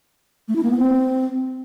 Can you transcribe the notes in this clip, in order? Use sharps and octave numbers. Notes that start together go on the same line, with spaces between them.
A3
E4
A#3
B3
C4